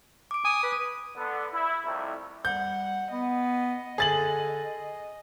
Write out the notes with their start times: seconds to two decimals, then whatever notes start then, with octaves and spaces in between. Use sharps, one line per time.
0.31 D6 D7
0.45 G#5 D#6
0.63 B4
1.16 D3 B3
1.53 E4
1.85 C2 F2 C3 A3 E4
2.45 G3 F#5 G6
3.12 B3 D#5
3.98 D3 G#4 A6 F#7